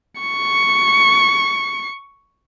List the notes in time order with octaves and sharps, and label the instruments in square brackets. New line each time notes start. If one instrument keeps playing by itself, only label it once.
[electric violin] C#6 C#7